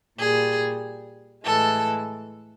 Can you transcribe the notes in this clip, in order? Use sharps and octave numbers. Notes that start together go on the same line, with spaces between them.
A#2 G3 G#4
A2 E3 G#3 A4